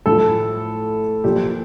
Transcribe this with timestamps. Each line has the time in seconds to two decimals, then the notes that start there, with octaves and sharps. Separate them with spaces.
0.06 A2 F3 A4
1.24 A#2 F3 G4